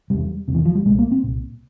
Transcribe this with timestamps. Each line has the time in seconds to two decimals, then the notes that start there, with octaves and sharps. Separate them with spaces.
0.10 E2 C3 G3
0.48 E2 C3
0.54 E3
0.65 F3
0.75 G3
0.86 A#2 G#3
0.89 C2
0.99 A#3
1.11 C4
1.24 C2 A#2